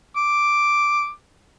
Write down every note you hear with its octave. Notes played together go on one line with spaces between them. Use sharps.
D6